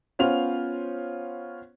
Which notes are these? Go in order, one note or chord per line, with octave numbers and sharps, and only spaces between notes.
B3 C#4 F4 C5 F7